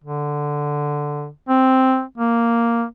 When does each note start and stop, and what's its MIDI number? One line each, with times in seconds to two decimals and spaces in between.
0.04 1.29 50
1.49 2.03 60
2.18 2.85 58